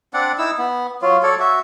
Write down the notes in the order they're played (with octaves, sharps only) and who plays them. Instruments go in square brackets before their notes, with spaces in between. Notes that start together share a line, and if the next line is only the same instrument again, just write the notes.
[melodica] C4 D4 D5 F#5
D#4 E4 E6
B3
F#3 F4
F#3 A4 C#5 D5
F#4 E5